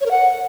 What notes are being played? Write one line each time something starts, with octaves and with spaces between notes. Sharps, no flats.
C#5
A#4
F#5